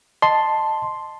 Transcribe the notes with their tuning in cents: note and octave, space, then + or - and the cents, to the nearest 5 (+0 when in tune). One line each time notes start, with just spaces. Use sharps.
D#5 -5 A5 +0 C6 +0